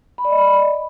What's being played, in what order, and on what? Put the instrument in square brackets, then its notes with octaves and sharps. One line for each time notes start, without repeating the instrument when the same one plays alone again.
[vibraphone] B5
D5
D#5
B5